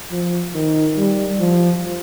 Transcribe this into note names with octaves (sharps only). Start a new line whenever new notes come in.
F3
D#3
G3
F3